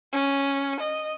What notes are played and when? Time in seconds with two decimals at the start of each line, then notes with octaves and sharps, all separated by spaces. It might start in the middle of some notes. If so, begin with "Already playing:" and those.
0.13 C#4
0.80 D#5